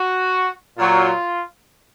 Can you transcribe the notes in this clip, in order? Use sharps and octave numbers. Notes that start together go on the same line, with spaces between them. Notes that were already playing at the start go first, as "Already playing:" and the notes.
Already playing: F#4
A#2 F#3 F4